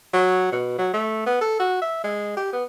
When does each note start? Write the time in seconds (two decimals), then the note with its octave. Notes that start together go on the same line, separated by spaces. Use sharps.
0.13 F#3
0.52 B2
0.78 F#3
0.93 A3
1.26 B3
1.41 A4
1.59 F#4
1.81 E5
2.04 G#3
2.37 G4
2.53 B3